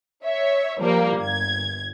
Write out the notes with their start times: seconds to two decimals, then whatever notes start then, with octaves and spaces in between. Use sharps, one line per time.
0.25 C#5 E5
0.81 F3 G3 A#3 A#4
1.19 G1 G#6